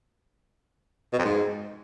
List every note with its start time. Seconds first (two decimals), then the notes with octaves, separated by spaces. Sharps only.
1.13 B2
1.19 F2
1.25 G#2